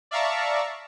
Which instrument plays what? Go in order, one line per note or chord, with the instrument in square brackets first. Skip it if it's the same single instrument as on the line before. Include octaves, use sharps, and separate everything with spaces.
[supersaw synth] D5 E5 F5 A5 A#5 C#6